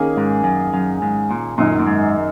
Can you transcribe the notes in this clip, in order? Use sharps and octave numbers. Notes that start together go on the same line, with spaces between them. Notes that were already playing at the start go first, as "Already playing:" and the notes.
Already playing: D#3 A#3 C#4 G#4
G#2
F#2
F#2
G#2
A#2
F#2 A#2 D#3 F#3 D#4
A#2
G#2